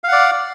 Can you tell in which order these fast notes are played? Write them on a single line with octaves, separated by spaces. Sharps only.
F5 F#5 D5